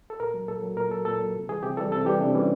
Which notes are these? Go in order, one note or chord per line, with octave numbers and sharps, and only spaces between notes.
A4
A#2 A#4
F#3
A#2 A4
F#3
A#2 A#4
F#3 A4
A#2 A4
F#3
C3
E3 G3 G#4
C3 G4
E3 G3 A4
C3 A4
E3 G3 G4
C3 D4
E3 G3 C#4